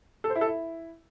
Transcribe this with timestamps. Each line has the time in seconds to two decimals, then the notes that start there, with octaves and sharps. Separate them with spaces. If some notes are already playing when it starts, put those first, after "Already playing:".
0.24 A4
0.30 C5
0.36 E4
0.41 A4
0.47 E4